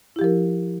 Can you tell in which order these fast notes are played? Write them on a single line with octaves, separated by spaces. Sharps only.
E4 G4 F3 A#4